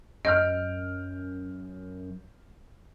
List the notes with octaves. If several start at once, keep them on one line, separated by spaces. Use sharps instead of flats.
F#2 D#5 F6 G6 D7